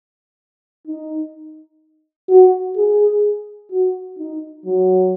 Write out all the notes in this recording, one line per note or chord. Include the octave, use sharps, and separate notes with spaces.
D#4
F#4
G#4
F#4
D#4
F#3